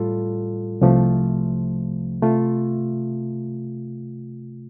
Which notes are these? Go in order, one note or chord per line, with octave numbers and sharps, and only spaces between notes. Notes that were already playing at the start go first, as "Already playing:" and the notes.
Already playing: A2 G3 F4 A4
C2 C3 F3 A3
C3 A3 F4